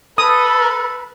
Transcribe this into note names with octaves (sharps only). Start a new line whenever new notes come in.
A4 B4 D#6